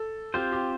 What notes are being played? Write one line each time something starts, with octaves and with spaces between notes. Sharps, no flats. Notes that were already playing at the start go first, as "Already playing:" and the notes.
Already playing: A4
C4 F4 G4 C5
G4